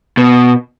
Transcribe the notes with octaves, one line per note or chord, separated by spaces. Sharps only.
B2